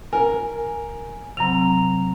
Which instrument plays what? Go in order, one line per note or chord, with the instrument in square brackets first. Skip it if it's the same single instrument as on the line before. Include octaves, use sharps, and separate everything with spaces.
[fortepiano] A#4 [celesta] G#5
[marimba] C3 F#3 C4 [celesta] A#5 F7